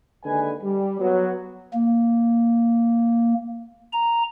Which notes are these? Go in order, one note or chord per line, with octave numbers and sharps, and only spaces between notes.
D#2 D3 G#3 B4 G#5
G3
F#3 B3
A#3
A#5